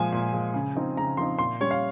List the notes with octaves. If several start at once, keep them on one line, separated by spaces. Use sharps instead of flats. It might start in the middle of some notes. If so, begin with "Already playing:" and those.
Already playing: A#2 F3 G#3 G#5
A#2
F3 G#3
C#3
F3 C4 D#4
C#3 A#5
F3 C4 D#4 C6
A#2 C6
G3 C#4 C#5
F5